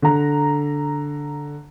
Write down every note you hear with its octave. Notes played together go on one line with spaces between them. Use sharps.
D3 A#5